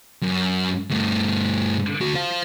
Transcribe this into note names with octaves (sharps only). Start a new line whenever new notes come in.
F#2
G2 A3
D2 F#4
C5 F5